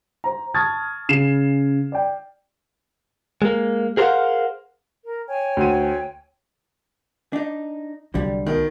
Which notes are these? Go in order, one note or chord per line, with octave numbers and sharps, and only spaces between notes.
C5 A#5
A5 C#6 D#6 F6 G#6 A6
C#3 C#4 C7 E7
D5 G5
G#3 A#3
G#4 A#4 C5 C#5 F5 F#5
A#4
C#5 G5 G#5
D2 D#7
D4 D#4
C2 D3 F#3 G3
B2 D#3